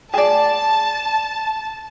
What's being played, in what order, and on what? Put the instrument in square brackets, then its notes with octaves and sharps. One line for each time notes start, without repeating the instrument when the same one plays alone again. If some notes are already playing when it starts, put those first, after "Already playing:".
[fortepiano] G#4 D5 [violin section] A5